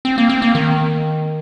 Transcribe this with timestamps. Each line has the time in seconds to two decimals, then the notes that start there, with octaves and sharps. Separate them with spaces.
0.05 C4
0.18 A#3
0.29 C4
0.42 A#3
0.55 D#3